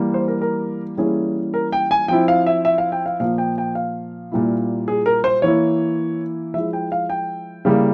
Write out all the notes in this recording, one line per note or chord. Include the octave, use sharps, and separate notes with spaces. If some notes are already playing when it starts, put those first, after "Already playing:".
Already playing: E3 G3 A#3
C5
A#4
A#4
E3 G3 A#3 C#4 E4 G#4
A#4
G5
G#5
F3 C4 E4 G5
F5
E5
E5
F5
G5
F5
A#2 F3 A#3 F5
G5
G5
F5
A#2 G3 A#3 E4
G#4
A#4
C5
E3 A#3 E4 C#5
F3 G#3 E4 E5
G5
F5
G5
C#3 G3 A#3 E4